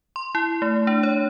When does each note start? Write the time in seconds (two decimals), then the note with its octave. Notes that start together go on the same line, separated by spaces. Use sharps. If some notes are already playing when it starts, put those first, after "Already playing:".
0.16 C6
0.35 E4
0.62 A3
0.87 D4
1.03 C#5